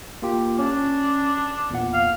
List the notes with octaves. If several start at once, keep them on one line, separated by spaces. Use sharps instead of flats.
A#3 F4 G4
C#4 D4
E2 A#2 F#5
F5